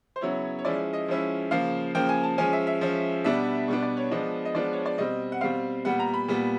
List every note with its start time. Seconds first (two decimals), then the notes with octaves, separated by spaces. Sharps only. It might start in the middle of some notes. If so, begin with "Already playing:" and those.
0.16 C5
0.21 C#3 F#3 B3 E4 C#5
0.59 C#5
0.65 F3 G#3 C#4 E4 D5
0.93 D#5
1.08 F3 G#3 C#4 E4
1.51 C#3 F3 A#3 F5
1.95 C#3 F3 A#3 G5
2.09 G#5
2.23 A5
2.38 F3 G#3 C#4 G#5
2.53 E5
2.67 E5
2.81 F3 G#3 C#4
3.24 B2 G3 B3 D4 E5
3.68 B2 G3 B3 D4
3.83 D5
3.97 C#5
4.11 F3 G#3 B3 D4 D#5
4.45 D#5
4.55 F3 G#3 B3 D4 D5
4.73 C#5
4.86 D5
4.98 B2 G3 C4 D#5
5.32 F#5
5.41 B2 G3 C4 F5
5.85 A#2 G3 B3 F#5
5.99 A#5
6.14 B5
6.28 A#2 G3 B3